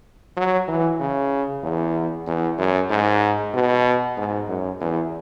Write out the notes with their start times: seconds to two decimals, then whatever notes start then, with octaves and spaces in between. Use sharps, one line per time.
0.37 F#3
0.68 E3
1.00 C#3
1.63 E2
2.27 E2
2.58 F#2
2.90 G#2
3.54 B2
4.17 G#2
4.48 F#2
4.80 E2